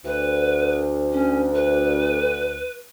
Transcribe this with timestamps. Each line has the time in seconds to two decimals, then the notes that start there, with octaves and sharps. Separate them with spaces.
0.05 D2 B4
1.13 C#4
1.55 B4